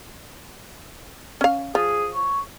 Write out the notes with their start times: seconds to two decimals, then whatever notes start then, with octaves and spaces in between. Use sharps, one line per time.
1.41 C#4 F5
1.75 F3 G#4
2.15 C#5